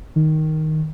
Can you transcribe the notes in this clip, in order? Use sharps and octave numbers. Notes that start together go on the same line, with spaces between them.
D#3